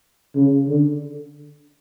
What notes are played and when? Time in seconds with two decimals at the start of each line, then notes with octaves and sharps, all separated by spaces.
0.35 C#3
0.68 D3